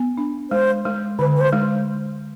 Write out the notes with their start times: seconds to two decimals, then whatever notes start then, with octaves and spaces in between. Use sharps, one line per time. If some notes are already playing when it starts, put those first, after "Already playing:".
Already playing: B3
0.17 D4
0.51 G#3 C5
0.85 G#3
1.19 D3 B4
1.36 B4
1.41 C5
1.52 G#3